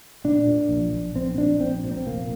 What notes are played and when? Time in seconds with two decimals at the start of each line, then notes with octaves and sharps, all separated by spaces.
0.24 A#2 D4
0.47 A#2
0.69 A#1
0.93 A#1
1.14 A#1 C4
1.37 A#1 D4
1.60 A#1 C4
1.84 A#2
1.91 C4
2.07 F1 A#3